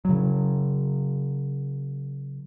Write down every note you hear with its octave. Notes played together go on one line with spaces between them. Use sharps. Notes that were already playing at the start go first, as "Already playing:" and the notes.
C#3 F#3